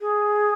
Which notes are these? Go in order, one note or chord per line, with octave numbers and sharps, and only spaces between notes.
G#4